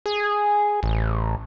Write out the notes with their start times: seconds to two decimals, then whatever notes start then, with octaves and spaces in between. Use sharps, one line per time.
0.06 G#4
0.83 A1